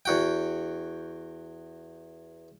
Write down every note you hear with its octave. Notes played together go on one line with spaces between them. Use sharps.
E2 F#4 G5